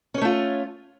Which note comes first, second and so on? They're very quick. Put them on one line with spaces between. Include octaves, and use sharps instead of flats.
C#4 C#5 A3 F4